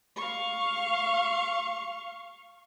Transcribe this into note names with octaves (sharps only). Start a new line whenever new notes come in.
F5 C#6